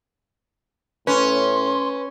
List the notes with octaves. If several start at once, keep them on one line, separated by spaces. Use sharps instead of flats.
A2 C#4 B4 C6